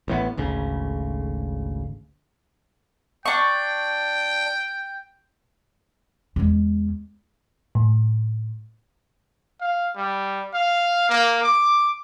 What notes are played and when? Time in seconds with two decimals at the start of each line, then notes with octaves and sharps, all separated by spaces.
0.08 A1 A2 C#3 B3
0.37 G#1 D2 C#3
3.26 D4 G5 C#6
6.36 E2 G#3
7.75 A2
9.61 F5
9.96 G3
10.54 F5
11.09 A#3
11.43 D6